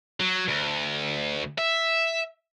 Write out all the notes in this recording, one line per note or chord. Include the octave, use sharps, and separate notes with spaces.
F#3
D2
E5